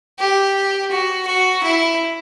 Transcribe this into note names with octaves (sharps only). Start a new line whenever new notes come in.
G4
F#4
F#4
E4